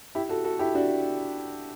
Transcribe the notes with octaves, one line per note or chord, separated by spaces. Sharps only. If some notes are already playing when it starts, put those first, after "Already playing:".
E4 G4
F#4 A4
F#4 A4
E4 G4
D4 F#4